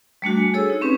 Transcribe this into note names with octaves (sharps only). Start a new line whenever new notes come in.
G3 A3 D4 F#4
G#5
G#4 A4 C#5 E6
D#4
C4 C#4 G4 B4